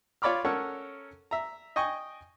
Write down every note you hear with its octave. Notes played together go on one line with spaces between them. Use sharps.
F4 C#5 D5 B5 D6 F6
C#4 A4 A#4 C#5 F#5 C#6
E5 A#5
D#5 G5 G#5 C#6